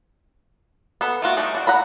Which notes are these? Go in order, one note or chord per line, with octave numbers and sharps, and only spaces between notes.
B3 A4 B5
A3 F4 F#4 A#4
G3 A3 D4 D#4
D4 F#4
F#5 A#5 B5